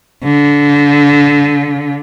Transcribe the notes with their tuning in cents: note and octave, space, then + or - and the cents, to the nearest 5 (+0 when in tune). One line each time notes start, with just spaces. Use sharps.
D3 -25